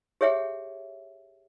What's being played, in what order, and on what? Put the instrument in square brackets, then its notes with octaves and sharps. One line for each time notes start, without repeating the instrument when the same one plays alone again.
[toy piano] G4 G#4 C#5 E5 F#5 G5